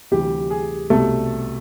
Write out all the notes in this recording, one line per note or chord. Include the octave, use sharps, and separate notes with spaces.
D2 C3 E3 G3 G4
G#4
C2 B2 G3 A3 A4